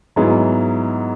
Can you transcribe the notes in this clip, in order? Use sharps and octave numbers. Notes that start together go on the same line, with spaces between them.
G#2 F#3 B3 E4 G#4